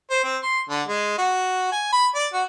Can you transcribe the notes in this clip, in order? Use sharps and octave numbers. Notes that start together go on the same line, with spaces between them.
C5
C4
C6
D3
G#3
F#4
G#5
B5
D5
F#4